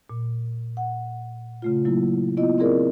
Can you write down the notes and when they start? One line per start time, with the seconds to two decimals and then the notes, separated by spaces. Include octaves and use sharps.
0.10 A#2
0.77 F#5
1.62 C#3 A3 F4
1.85 F#3 A#3 E4
2.37 B3 E4 F4 D#5
2.58 C4 E4 G#4 A#4 D5